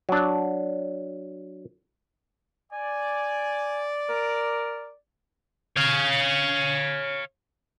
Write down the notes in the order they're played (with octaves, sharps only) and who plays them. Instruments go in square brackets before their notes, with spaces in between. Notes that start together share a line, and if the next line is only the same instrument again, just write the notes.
[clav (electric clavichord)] F#3 D4
[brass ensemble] D5 [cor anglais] G#5
[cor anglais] A#4
[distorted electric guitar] C#5 F5